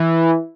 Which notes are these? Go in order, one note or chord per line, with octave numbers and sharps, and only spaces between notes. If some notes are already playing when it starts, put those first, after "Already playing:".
Already playing: E3